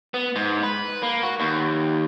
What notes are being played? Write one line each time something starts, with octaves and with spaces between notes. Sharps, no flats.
B3
G#2
B4
A#3
F#4
D#2